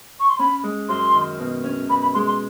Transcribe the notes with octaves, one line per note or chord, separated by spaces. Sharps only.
C#6
C6
C#4 B5
G#3
F#2 C6
D#3
B2
C#4
B2 B5
B5
G#3 C6
C6